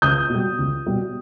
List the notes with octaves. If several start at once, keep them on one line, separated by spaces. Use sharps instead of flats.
C#2 D#6 G6
B2 G3
C#2
B2 G3